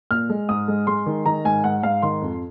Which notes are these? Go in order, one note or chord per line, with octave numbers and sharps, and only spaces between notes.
A#2 F6
G#3
G#2 D#6
G#3
G#3 C6
D#3
D#3 A#5
G#2 G#5
G#2 F#5
G#2 F5
D#3 C6
F2